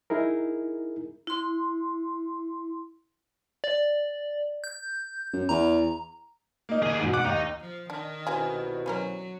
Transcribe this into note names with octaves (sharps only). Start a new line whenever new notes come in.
D#4 E4 G#4 A#4
E4 C6
D5
G6
F#2
E2 A#5
A#3 D#4
D#2 G#4
G#2 B2
F#5 D6
D#2 D#4
F3
D#3 D4
C2 B2 C#4 E4 G#4
F#3 B3 C#4 A#4